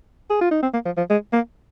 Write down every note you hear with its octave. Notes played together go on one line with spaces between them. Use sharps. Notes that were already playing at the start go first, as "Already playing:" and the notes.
G#4
F4
D#4
C4
A#3
F3
F3
G#3
A#3